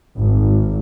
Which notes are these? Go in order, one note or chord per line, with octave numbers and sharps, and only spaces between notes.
G#1